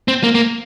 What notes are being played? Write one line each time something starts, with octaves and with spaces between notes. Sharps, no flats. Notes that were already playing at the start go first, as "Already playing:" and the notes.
C4
A#3
A#3